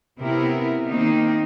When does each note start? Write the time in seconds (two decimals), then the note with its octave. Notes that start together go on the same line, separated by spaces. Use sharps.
0.19 C3 B3 E4 A#4
0.87 D#3 A#3 C4 D#4